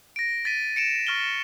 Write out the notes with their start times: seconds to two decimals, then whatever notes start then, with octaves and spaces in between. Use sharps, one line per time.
0.16 A#6 D7
0.45 A6 B6 D#7
0.76 C#7 D7 E7
1.07 C#6 F6 A6 G7